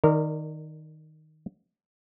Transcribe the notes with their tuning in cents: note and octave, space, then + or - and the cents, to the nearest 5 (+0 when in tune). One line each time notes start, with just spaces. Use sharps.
D#3 +0 A#4 -25 D5 +10